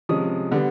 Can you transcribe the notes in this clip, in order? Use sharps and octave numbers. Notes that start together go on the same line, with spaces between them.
C3 F3 G#3 C#4 D#6
D3 G3 B3